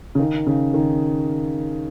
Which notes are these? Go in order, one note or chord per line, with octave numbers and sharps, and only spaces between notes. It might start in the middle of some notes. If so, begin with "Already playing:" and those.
C#3
D#3
C#3
D#3